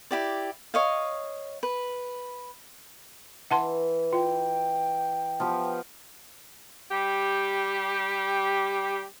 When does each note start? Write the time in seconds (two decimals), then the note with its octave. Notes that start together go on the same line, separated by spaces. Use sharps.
0.11 E4 G4 D5
0.74 C#5 D#5 F5
1.63 B4
3.51 E3 F#5 A5 C6
4.13 F4 G5
5.40 F3 B3 G4
6.91 G3 G4